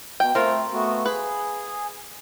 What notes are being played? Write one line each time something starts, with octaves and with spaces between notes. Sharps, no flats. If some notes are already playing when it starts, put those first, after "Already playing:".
B2 G5
A3 C4 F4 A#4
A3 B3 F#4
G#4 B4